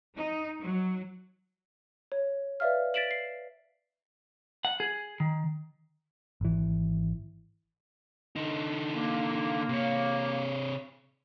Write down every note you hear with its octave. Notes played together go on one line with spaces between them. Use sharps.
D#4
F#3
C#5
B4 D5 E5 F5 F6
A6 B6 D7 E7 F#7
C7
F#5
G#4
D#3
G#1 E3
D3 D#4
A#3
C3 C#5